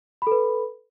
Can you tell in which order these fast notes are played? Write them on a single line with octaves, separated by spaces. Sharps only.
B5 A4 B4